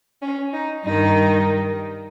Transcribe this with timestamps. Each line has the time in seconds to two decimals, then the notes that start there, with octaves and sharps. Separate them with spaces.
0.22 C#4
0.53 D#4
0.84 G2 D#3 D#4